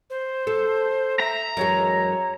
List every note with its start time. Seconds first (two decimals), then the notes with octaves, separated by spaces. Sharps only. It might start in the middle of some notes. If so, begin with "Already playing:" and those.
0.10 C5
0.47 A4
1.20 E5 A#5
1.57 F#2 E3 G#3 C#5